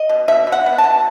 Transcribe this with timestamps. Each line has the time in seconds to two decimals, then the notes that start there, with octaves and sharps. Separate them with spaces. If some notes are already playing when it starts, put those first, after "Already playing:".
Already playing: D#5
0.09 B2
0.28 B2 E5
0.47 B2
0.52 F#5
0.66 B3
0.78 A5
0.84 B2